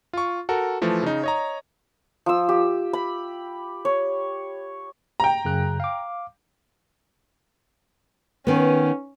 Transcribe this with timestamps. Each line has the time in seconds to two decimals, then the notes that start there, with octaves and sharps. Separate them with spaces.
0.13 F4 C#6
0.49 F#4 A4 A#4
0.81 E3 F3 A3
1.03 C#3 D#4
1.23 C#5 D#5 A#5
2.26 F3 E6
2.49 G4
2.93 B5
3.85 C#5
5.20 G5 A#5
5.45 F#2 C#3 F#6
5.80 F5 D6
8.47 D#3 B3 C#4